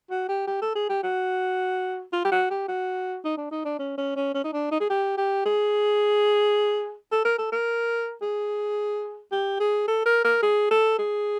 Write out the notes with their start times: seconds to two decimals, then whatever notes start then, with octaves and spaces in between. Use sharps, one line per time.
0.10 F#4
0.29 G4
0.47 G4
0.61 A4
0.75 G#4
0.89 G4
1.03 F#4
2.13 F4
2.25 G4
2.32 F#4
2.50 G4
2.68 F#4
3.24 D#4
3.37 D4
3.51 D#4
3.65 D4
3.79 C#4
3.98 C#4
4.16 C#4
4.34 C#4
4.44 D#4
4.53 D4
4.71 D#4
4.80 G#4
4.90 G4
5.17 G4
5.45 G#4
7.12 A4
7.25 A#4
7.38 A4
7.52 A#4
8.22 G#4
9.32 G4
9.60 G#4
9.88 A4
10.06 A#4
10.25 A#4
10.42 G#4
10.71 A4
10.98 G#4